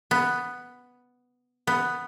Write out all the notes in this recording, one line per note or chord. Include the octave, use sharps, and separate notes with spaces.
B3
B3